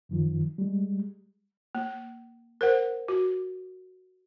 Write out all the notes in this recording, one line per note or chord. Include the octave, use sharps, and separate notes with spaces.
F#2 D#3 F3
G3 G#3
A#3
A#4 C5 F#5
F#4